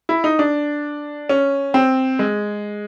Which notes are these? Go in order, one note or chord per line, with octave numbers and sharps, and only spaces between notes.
E4
D#4
D4
C#4
C4
G#3